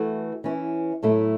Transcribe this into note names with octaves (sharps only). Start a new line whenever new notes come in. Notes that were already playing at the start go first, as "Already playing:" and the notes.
Already playing: E3 A3 F#4
E3 C#4 E4
A2 F#3 A3 E4